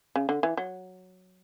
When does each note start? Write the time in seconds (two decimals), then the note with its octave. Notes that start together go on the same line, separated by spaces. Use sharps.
0.16 C#3
0.29 D3
0.43 E3
0.57 F#3